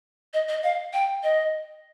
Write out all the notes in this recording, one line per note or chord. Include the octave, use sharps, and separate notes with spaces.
D#5
D#5
F5
G5
D#5